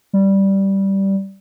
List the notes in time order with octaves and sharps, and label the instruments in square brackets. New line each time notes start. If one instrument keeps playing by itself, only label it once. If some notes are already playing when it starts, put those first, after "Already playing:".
[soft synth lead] G3